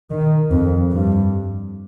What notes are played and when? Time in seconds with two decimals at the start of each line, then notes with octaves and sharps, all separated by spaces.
0.11 D#3
0.51 F2
0.92 G2